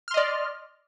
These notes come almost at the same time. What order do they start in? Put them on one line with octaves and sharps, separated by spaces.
F6 C6 D#5 D5